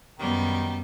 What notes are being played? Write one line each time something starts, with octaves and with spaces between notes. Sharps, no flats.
F#2 D#3 G3 B3